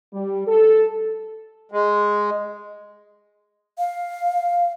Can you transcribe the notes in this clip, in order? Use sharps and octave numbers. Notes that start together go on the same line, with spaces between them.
G3
A4
G#3
F5